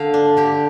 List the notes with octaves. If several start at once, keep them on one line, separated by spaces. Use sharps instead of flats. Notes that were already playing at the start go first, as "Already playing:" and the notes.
Already playing: D3 F5
D4
D3 G4